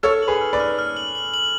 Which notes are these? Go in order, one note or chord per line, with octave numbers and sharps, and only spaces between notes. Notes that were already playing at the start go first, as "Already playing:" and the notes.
A4 C#5 F6
F#7
G#4 B4
F6
B4 D5
F6
F6
F#7
F#7
F#7